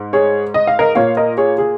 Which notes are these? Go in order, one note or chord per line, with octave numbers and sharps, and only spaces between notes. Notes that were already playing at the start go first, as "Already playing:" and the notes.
Already playing: G#2
G#4 C#5
D#5
F5
A#4 D#5
A#2 A#3 C#5 F5
A#4 D#5
G#4 C#5
G#4